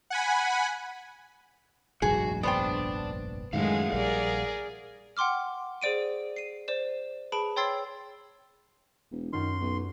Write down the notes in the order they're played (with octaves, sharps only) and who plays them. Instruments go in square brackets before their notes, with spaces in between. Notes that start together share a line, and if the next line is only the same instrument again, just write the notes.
[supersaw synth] F#5 G#5 B5
[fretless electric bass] F1 A#1 G2 [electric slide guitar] F#4 [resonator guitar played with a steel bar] G#4
[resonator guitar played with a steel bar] B3 C5 G5 [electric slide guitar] D4 D5
[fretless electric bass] F#2 D#3 [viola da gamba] A2 G#3 G#4 [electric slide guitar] F5 F#5
[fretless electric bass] A#1 G3 [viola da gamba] G#4 A#4 D5
[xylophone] F#5 G5 C6 D6 F6
G#4 C5 D5 D7 D#7
C7 D#7
C5 D5 E7
G#4 B4 A5 B5 D7
C#5 G5 C6 E6 A6 C7
[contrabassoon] E1
[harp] F#2 F4 F6 [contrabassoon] D#3 [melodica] C6
[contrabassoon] B1 [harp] A#3